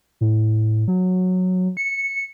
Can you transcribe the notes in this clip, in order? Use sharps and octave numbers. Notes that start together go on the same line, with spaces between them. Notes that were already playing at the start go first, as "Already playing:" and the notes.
A2
F#3
C#7